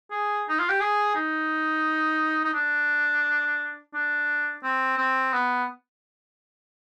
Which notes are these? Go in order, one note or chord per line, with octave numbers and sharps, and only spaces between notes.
G#4
D#4
F4
G4
G#4
D#4
D#4
D4
D4
C4
C4
B3